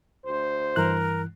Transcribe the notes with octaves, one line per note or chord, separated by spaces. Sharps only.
D2 C5
G2 E3 A#4 F#6